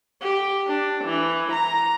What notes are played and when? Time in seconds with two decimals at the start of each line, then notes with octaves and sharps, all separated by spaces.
0.21 G4
0.67 D4
1.05 E3
1.52 A#5